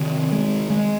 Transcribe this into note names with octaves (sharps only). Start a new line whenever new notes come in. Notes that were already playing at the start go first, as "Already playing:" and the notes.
Already playing: C3 D#3
G#3
G#3